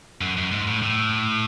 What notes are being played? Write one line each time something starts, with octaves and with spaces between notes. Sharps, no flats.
F#2
F#2
G#2
A2
A2